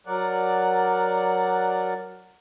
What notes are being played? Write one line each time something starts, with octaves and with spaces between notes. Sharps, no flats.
F#3 A#4 D5 F#5